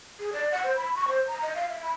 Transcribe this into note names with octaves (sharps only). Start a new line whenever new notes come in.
G#4
D5
F#5
C5
B5
C#6
C5
A#5
D#5
F5
E5
B5